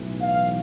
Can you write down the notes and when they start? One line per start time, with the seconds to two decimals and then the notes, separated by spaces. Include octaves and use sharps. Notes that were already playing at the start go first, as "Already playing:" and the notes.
Already playing: B1 A2 E3
0.21 F5